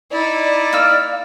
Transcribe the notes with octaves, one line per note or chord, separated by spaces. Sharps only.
D#4 E4 D5
A#3 E6 F6